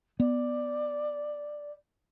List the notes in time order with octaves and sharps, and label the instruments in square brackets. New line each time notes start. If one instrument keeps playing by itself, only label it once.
[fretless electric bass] B3 [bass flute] D5